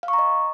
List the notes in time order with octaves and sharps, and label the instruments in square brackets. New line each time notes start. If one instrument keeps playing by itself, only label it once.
[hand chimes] F5
C#6
A#5
D#5